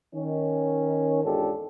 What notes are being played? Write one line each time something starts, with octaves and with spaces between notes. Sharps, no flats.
D#3 C#4
E2 G#2 D4 F4 G4 A4